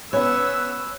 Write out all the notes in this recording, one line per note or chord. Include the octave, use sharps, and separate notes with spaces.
B3 C#4 B4 C#5 E6